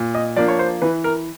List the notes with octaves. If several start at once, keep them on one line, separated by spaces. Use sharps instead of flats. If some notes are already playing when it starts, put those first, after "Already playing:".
Already playing: A#2
D#5
F3 A#3 D4 D5
C#5
C5
E3 B4
A#4